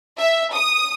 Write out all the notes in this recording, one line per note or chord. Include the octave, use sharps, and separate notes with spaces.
E5
D#6